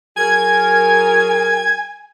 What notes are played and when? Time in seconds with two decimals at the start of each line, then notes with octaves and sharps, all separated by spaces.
0.17 F#3 G#4 A#4 G#5 G#6